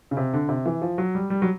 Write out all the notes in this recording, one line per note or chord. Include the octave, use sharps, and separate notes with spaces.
C#3
C3
D3
C3
E3
F3
F#3
G3
G3
F#3